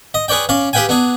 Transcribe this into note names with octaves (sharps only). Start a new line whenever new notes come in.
D#5
G#4 B4 C#5 D5 G5
C#4 D5 F5
G4 G#4 B4 F5 G5 G#5
B3 D4 G#4